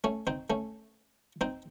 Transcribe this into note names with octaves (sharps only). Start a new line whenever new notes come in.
A3 C#4
C4 D#4
A3 C#4
C4 D#4